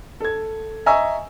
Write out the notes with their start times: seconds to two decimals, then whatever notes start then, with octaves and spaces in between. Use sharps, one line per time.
0.20 A4 G#6
0.86 D#5 E5 G#5 A#5 C#6 E6